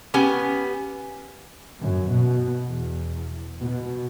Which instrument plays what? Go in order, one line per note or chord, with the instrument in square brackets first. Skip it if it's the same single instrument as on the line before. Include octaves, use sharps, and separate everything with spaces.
[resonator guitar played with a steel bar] B3 C#4 G4 G#5
[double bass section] F#2
B2
E2
B2